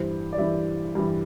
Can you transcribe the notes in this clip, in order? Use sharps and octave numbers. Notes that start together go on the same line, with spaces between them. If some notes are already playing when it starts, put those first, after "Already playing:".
Already playing: G2 E3 C5
D5
G2 E3 E5
G2 E3